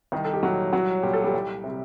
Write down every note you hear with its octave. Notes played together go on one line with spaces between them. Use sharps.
C2 D#3 D#4
A4
G4
A#2 F#3 G3 F#4
C2 F#3 F#4
A#2 G3 G4
A4
G3 G4
C2
C3 G3